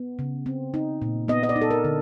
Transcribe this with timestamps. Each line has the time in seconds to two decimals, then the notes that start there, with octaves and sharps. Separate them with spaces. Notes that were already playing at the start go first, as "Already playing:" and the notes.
Already playing: B3
0.19 C#3
0.46 C4
0.74 D#4
1.02 A#2
1.28 B3 D#5
1.43 D#5
1.49 D5
1.56 D#4
1.61 A4
1.71 A#4
1.84 D3